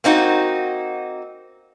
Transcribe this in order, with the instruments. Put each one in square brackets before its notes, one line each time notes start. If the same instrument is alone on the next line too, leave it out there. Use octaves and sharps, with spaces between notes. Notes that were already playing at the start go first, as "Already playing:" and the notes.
[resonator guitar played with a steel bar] A#3 C4 D#4 F4 F#4